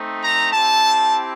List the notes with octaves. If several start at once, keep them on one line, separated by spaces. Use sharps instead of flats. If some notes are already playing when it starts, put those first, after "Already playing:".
Already playing: A3 C4 D#4
A#5
C4 E4 G4 A5